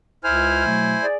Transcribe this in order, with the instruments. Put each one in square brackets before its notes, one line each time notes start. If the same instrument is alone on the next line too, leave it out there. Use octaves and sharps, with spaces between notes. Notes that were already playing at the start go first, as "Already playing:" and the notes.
[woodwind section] C#2 F6 [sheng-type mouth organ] E4 C5 G#5
[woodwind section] B2 F#3 A3
G#4 D5